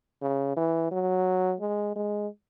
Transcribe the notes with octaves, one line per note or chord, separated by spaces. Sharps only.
C#3
E3
F#3
G#3
G#3